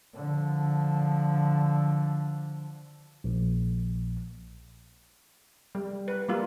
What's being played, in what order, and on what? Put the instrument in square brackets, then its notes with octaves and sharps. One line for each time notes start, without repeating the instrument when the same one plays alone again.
[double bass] D3 F3
[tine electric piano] A#1
[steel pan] G3
B4
G3 A#3 F4